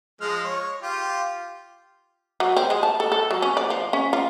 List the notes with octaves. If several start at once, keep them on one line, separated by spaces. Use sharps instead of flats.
F3 G#3 F6
C#5
F4 G4
F#3
C4
G#3
A5
A4
A4
F#3
C#4
D5
F3
C#4
F4